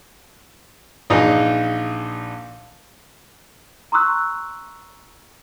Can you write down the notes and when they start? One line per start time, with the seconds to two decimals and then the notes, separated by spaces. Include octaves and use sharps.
1.10 A#1 E3 D#4 G#4
3.92 A#5 C6 C#6 D#6 E6 F#6